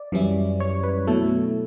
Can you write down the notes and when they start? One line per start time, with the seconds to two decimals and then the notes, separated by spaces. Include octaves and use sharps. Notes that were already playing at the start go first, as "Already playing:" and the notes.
Already playing: D5
0.12 F#2 E3 G3 C#4 E4
0.60 C#5
0.83 B4
1.07 B2 F#3 A3 E4 A4